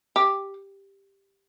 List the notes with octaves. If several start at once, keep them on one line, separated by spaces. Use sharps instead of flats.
G4